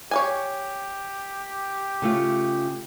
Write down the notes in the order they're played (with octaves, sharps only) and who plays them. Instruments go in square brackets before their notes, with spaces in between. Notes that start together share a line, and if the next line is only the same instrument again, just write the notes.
[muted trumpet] G4 [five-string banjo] C#5 F5 G#5
[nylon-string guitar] C#3 A3 F4